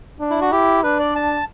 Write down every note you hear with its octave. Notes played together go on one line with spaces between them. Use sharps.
D4
E4
F#4
E4 G4
D4 B4
D5
A5